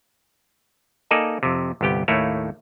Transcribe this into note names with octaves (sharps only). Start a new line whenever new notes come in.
A#3 D#4 A4 D5 D#5 G#5
F2 C3
G1 C2 B3 G4 G5
D#2 A2 A3 A#3 E4 C#5